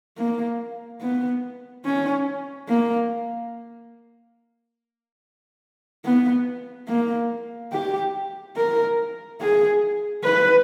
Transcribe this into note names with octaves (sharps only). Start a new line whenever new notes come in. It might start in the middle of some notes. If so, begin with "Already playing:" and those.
A#3
B3
C#4
A#3
B3
A#3
G4
A#4
G#4
B4